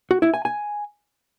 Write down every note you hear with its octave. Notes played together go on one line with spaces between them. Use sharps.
F#4
E4
G#5
G#5